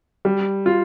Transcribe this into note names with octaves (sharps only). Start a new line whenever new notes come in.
G3
F4